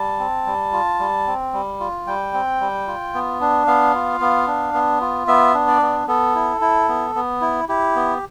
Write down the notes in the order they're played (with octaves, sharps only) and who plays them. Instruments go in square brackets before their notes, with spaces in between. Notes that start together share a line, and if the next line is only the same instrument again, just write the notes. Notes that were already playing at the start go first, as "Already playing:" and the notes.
Already playing: [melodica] G3 A5
C4
G3
F4
G3
C4
G3
F4
G3 G5
C4
G3
F4
B3
D4
B3 F5
F4
B3
D4
B3
F4
B3 E5
D4
D5
B3
B3 A4
E4
E4
B3
B3
E4
E4 G4
B3